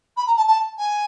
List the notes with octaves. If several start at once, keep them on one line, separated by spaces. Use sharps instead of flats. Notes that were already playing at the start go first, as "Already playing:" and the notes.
B5
A#5
A5
A5
G#5